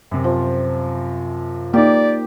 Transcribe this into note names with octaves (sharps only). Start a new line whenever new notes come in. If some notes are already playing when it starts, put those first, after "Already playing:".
F#2 C3
F3
A#3 D#4 G4 D5